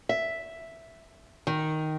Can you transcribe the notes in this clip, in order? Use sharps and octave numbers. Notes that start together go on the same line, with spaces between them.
E5
D#3